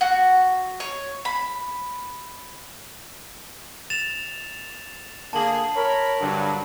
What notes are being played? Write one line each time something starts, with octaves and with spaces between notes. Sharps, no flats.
F#4
C#5
B5
A6 E7 F7
D3 A#3 G#4 A5 F#7
A#4 C#5 B5
G2 D3 F#3